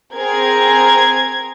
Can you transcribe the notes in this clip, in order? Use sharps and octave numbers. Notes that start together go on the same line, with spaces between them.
C4 G#4 A#4 G#6